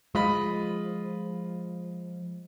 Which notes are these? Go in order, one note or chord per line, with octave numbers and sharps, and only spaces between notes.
F3 G#3 F4 D#5 B5